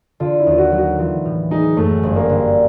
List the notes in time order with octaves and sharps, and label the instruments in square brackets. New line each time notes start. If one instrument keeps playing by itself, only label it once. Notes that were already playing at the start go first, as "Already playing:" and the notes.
[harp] D3 [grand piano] F4
[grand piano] E4
[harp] D#2 [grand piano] F4
[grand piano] F#4
[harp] F#3
[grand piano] F#4
[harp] E3 [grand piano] F4
[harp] A2
[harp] G#3 [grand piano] D#4
[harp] F#2 [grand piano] A3
[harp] G1
[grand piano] A#3
[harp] D3